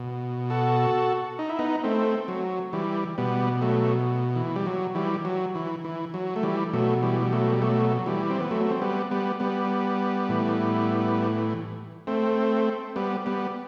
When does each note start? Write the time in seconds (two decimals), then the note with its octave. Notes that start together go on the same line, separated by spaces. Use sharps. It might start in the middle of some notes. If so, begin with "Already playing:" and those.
Already playing: B2
0.50 F#4 A4
1.39 D#4
1.49 E4
1.59 B3 D#4
1.84 A3 C4
2.28 F#3
2.73 E3 G3
3.18 B2 G3 B3
3.61 F#3 A3
4.36 E3
4.56 G3
4.66 F#3
4.95 E3 G3
5.25 F#3
5.55 E3
5.84 E3
6.14 F#3
6.36 A3
6.43 E3 G3
6.73 B2 F#3 A3
7.03 E3 G3
7.22 G3
7.32 F#3 A3
7.52 G3
7.62 F#3 A3
7.99 F#3
8.06 E3 G3
8.30 C4
8.40 B3
8.51 F#3 A3
8.70 C4
8.81 G3 B3
9.11 G3 B3
9.40 G3 B3
10.29 A2 E3
12.07 A3 C4
12.96 G3 B3
13.26 G3 B3